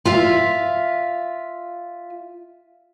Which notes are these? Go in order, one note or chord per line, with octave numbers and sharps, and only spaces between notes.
F4 E5 F5